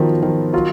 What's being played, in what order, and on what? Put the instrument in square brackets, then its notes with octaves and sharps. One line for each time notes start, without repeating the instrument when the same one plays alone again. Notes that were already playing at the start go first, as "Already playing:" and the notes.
Already playing: [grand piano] D#3 B3 F4 [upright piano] F3 F#3
[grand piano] D#3 [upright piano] F3
[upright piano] F#3 [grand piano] F4